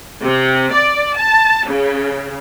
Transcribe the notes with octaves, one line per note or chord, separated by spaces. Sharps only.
C3
D5
A5
C#3